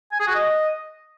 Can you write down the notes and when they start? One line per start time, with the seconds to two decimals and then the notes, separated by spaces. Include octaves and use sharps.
0.12 G#5
0.20 G#4
0.27 F#4
0.35 D#5